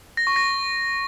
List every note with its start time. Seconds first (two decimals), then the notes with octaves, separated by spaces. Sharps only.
0.17 A#6
0.27 C#6
0.36 A#6